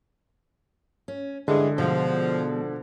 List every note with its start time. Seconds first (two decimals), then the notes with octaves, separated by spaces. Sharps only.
1.08 C#4
1.48 G2 D3 E3 G#3 G#4
1.78 B2 F3 G#3